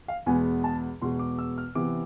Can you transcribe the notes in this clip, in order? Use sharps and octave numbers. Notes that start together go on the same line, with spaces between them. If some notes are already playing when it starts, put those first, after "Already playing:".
F5
E2 B2 G#3 B3 G#5
A5
E2 B2 G#3 B3 C6
D6
E6
F6
C3 E3 B3 D6